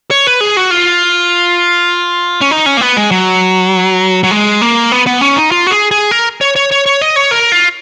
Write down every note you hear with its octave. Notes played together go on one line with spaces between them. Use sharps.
C#5
B4
G#4
F#4
F4
C#4
D#4
C#4
A#3
B3
G#3
F#3
F#3
G#3
A#3
B3
B3
C#4
D#4
F4
F#4
G#4
G#4
A#4
C#5
C#5
C#5
C#5
D#5
C#5
A#4
F4